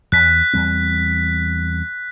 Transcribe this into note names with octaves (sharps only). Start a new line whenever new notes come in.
E2 F#6 B6
E2 G3 C4